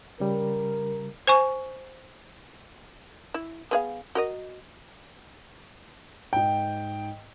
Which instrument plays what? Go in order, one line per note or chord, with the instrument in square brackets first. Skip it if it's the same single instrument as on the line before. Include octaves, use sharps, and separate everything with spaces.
[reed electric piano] C#3 G3 [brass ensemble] A#4
[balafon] C5 G#5 C#6
[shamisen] E4
B3 G#4 F5
F#4 A#4 D#5
[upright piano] G#2 G5